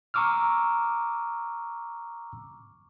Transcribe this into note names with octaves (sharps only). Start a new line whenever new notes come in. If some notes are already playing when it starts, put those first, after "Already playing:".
A#5 C#6 D6 E6 F6